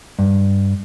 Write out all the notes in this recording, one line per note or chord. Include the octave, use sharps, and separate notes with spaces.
G2